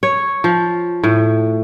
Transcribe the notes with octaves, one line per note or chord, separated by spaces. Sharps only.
C#5
F3
A2